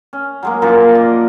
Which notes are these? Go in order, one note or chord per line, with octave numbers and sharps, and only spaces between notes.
C#4
F#3 G#3 A#3
F#2 A#2 F3 A#4
D5 D#5